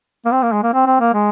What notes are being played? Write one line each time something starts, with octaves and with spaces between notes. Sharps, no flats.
A#3
C4
A#3
G#3
A#3
C4
C4
A#3
G#3